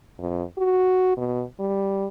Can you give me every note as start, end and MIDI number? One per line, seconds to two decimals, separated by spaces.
0.19 0.43 41
0.58 1.17 66
1.17 1.44 47
1.60 2.07 55